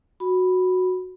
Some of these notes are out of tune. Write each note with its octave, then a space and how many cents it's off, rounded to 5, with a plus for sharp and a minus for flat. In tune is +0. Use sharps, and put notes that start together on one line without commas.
F#4 -10 B5 +0